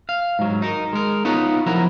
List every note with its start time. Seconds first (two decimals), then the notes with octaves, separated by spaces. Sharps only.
0.09 F5
0.39 G#2 F#3
0.62 D#4 A#4
0.93 G#3 A#4
1.25 B3 D#4 F4 B4 C#5
1.66 F3 F#3 E4 F#4 A#4 A#5